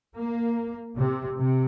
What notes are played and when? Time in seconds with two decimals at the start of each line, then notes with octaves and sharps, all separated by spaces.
0.16 A#3
0.96 C3
1.37 C3